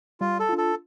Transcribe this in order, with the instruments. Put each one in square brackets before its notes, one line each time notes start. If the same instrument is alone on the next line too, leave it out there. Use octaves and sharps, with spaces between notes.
[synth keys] G3 [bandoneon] F4
[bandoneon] A4
[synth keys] D4 F4
[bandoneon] A4